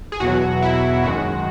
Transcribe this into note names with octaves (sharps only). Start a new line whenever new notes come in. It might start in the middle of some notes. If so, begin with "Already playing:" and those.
G#4
E2 B2 F#3 F#4
E4
F#2 D#3 G#3 F#4